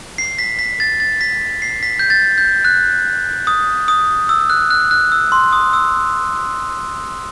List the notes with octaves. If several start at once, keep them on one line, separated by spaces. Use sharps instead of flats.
C7
B6
B6
A6
A6
B6
C7
B6
G6
A6
G6
F#6
D#6
D#6
E6
F#6
F#6
F#6
E6
C6
D#6
E6